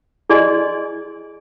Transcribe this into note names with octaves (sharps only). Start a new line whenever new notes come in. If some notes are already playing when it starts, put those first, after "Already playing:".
E4 G#4 D5 D#5 G#5 C6